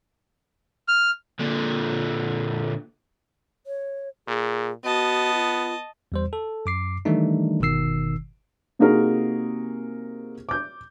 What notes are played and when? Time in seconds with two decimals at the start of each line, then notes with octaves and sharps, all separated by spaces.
0.88 F6
1.40 A#2 D3
3.67 C#5
4.28 A#2 G#4
4.85 B3 F#4 D#5 A5
5.34 F4
6.12 E2 G3 C5
6.33 A4
6.66 F#2 D6 C7
7.05 D#3 E3 G3 A3 D4 D#4
7.60 G1 B2 D#3 E6 C7
8.79 C3 A#3 D#4 F#4 G#4 A#4
10.49 D6 G6